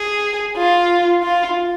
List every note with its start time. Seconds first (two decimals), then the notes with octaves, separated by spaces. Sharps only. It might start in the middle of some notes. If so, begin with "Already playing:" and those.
Already playing: G#4
0.57 F4
1.23 F4